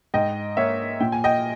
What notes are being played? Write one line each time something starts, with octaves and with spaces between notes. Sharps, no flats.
G#2 D#5 G5
A#3 C#5 E5
A#2 G5
G#5
D#5 G5